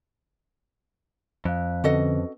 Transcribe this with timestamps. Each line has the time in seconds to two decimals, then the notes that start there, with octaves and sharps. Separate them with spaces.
1.45 F2 F5 F#6
1.84 D3 C4 C#4 F#4 A4 B4 D#5